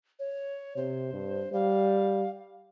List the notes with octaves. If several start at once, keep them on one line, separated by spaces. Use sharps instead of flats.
C#5
C3 C5
G2
G3 F5